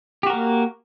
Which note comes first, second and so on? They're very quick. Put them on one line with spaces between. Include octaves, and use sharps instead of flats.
G4 F#4 A#4 A#3